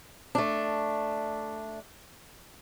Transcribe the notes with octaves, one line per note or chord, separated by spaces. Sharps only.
A3 D4